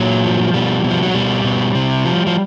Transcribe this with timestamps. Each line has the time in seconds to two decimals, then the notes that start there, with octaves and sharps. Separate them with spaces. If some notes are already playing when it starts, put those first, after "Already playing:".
Already playing: A#2 F#3
0.24 F3
0.54 B2 G3
0.84 B2
0.90 F3
1.03 F#3
1.14 B2 G3
1.44 B2
1.75 C3
2.05 F3
2.27 F3